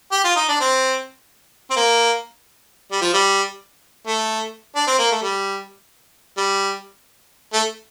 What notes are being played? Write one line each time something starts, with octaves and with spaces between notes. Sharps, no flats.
G4
F4
D#4
D4
C4
C4
A#3
G3
F3
G3
A3
D4
C4
A#3
A3
G3
G3
A3